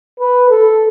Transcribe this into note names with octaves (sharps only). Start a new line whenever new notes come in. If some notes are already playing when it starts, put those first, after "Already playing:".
B4
A4